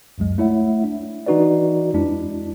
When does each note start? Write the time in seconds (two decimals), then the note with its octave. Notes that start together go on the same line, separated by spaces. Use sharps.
0.18 C#2 F#2 F#3 G#3
0.38 A3 E4 C#5 E5 F#5
0.84 D4
1.26 E3 D4 D#4 F#4 B4 D5
1.94 F2 G#3 D4 E4